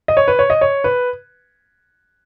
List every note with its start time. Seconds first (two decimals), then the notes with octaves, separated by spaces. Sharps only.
0.08 D#5
0.17 C#5
0.28 B4
0.39 C#5
0.50 D#5
0.61 C#5
0.84 B4